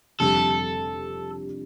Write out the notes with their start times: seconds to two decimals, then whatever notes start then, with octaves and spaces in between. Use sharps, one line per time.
0.20 F1 F2 D3 G3 A4